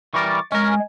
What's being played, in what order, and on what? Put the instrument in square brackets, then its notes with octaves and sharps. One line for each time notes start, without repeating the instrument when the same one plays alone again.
[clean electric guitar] E3 G3 A#4 [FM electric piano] C#6 D6 A6
[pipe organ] G#3 [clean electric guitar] C#4 A#4 [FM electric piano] G#5